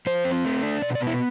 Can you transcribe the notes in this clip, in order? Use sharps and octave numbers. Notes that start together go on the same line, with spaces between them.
F3 C5
C4
A3
D4
B2 D5
D5
B3
E4